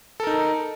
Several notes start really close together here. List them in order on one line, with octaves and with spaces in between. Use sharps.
A4 A#4 D#4